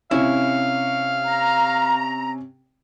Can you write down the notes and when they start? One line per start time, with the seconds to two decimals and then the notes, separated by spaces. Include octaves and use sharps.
0.11 C3 C#4 E4 F5
1.25 A#5